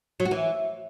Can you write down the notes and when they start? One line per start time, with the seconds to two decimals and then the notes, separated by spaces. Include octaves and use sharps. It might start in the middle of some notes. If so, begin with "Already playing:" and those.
0.20 F#3
0.25 F#4
0.31 E3